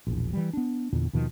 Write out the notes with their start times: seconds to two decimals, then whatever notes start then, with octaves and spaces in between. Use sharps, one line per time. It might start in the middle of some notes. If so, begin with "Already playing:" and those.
0.07 E1 A#1
0.33 E3 G3
0.53 B3 D4
0.93 E2 A#2 D3
1.13 D#2 B2 D#3 F3